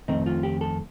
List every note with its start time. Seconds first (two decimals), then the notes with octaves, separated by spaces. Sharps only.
0.08 F2 D#3 A3 C4 D#4
0.26 F4
0.43 G4
0.61 A4